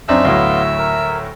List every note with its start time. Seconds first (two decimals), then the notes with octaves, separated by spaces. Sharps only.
0.09 F#2 C4 D4 D#4 C5 E5
0.25 D2 A2 F#3 B3 F5 C6
0.78 A#4